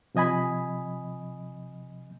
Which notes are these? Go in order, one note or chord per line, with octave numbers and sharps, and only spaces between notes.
C3 F3 D#5 G#5 B5